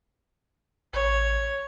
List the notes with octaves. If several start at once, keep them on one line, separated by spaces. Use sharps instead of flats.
A1 C#5